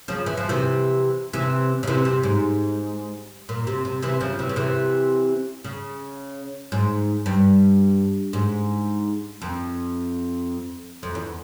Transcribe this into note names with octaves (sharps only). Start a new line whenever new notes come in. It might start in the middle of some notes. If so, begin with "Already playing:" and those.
C#3 F3
E3
F3
C3 E3
C3 E3
C#3
C3 E3
C3
G#2
A#2
C3
C3
C3 E3
C#3 F3
C3 E3
C#3
C3 E3
C#3
G#2
G2
G#2
F2
F2
E2